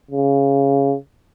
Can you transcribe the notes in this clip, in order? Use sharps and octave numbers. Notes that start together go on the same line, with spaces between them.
C#3